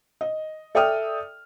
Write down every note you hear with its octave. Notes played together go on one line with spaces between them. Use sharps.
D#5
A4 D5 E5 G5 D#6 F6